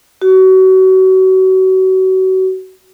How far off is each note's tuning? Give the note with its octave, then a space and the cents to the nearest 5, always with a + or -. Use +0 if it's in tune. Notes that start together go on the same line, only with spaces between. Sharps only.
F#4 +30